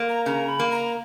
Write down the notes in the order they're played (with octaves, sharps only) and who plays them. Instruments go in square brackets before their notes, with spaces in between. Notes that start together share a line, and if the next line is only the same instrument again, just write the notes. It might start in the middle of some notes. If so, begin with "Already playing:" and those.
Already playing: [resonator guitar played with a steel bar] A#3
[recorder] A#5
[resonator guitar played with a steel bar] C#3 [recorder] A#5
[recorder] B5
[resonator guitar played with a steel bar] A#3
[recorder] A#5